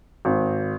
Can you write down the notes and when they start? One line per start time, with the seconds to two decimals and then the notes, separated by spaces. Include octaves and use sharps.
0.25 G#1